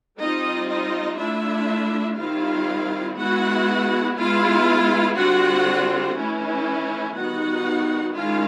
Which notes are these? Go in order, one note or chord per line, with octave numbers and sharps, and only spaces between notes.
G3 C4 D#4 F4 D#5
D#4 D#5
A3 D4 E4 F4 E5
D#3 G3 C4 E4 F4 F5
G#3 B3 E4 F#4 F#5
G#3 B3 E4 F4 F5
D3 G3 C4 F4 F#4 F#5
E3 A3 C#4 E4
D#3 G3 B3 D#4 F#4 F#5
D#3 G#3 C#4 E4 F4 F5